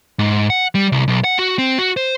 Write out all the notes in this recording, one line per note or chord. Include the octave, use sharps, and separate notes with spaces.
G#2
F#5
G3
C2
B1
F#5
F#4
C4
F#4
C5